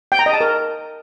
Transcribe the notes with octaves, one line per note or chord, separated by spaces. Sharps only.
G5
A#5
D#5
A5
A#4